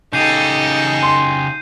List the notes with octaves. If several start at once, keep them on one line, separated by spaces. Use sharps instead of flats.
C#3 D#4 G4 A4 G6 C7 D#7
C6